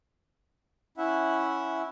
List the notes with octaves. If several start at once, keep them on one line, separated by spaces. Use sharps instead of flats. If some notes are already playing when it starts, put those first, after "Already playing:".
C#4 E4 E5 F#5